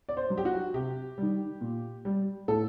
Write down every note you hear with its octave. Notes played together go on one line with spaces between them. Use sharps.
D5
C5
F#3
G4
F#4
C3 G4
D#3 G3
A#2
G3
A2 A4